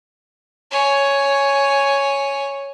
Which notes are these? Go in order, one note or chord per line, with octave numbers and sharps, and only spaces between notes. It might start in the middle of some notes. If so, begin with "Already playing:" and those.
C#5 G#5